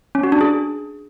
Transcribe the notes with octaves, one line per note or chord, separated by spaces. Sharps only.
C#4
F#4
D4
G#4